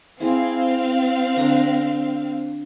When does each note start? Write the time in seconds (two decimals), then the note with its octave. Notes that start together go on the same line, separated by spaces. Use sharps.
0.20 C4 E4 G#4 F5 C6
1.36 D3 D4 A#5